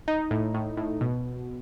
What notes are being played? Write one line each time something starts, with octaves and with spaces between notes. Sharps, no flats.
D#4
A2
A2
A2
B2